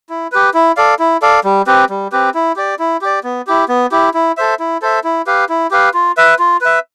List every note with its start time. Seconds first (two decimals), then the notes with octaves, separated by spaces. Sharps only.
0.09 E4
0.32 G4 B4
0.54 E4
0.77 A4 D5 F5
0.99 E4
1.22 A4 D5 F5
1.44 G3
1.67 C4 G4 B4
1.90 G3
2.12 C4 G4 B4
2.34 E4
2.56 G4 D5
2.79 E4
3.02 G4 D5
3.24 B3
3.47 E4 G4
3.69 B3
3.92 E4 G4
4.14 E4
4.37 A4 C5 E5
4.60 E4
4.82 A4 C5 E5
5.04 E4
5.27 G4 B4 F5
5.49 E4
5.71 G4 B4 F5
5.94 F4
6.17 B4 E5
6.39 F4
6.61 B4 E5